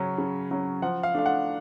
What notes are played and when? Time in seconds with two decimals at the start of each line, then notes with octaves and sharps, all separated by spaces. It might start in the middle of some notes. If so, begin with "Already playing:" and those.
Already playing: C#3 F#3 C#4
0.18 C#3
0.51 F#3 C#4
0.82 F3 F#5
1.03 F5
1.15 A3 D4 F5
1.26 F#5